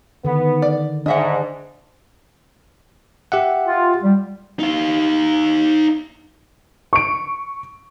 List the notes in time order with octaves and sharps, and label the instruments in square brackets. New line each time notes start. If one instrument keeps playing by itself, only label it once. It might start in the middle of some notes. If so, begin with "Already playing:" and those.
[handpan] D3 D#3 [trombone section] B3
[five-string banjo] D5
[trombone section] G#2 [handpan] D4 [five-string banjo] D#5 E5 F#5
[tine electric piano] G4 E5 F#5
[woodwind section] F4
G3
[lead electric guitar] D#4 F5
[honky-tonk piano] C#6 D7